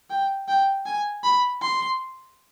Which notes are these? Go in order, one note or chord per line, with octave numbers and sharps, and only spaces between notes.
G5
G5
G#5
B5
C6